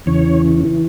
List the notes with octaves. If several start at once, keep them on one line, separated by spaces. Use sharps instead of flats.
E2 C#3 E3 C#5
E3